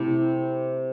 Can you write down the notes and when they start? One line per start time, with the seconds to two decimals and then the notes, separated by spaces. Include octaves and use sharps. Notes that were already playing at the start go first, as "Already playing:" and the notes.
Already playing: C3 A3 E4